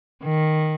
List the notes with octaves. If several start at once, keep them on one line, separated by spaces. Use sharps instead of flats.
D#3